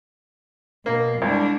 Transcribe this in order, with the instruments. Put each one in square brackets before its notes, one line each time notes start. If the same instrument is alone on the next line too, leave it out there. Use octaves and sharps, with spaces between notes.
[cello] B2 [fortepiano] A#3
[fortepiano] C2 [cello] G#3 D4